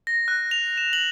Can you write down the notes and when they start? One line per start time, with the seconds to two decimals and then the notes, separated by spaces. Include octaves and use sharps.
0.07 A#6
0.28 F#6
0.51 F7
0.77 E7
0.93 F#7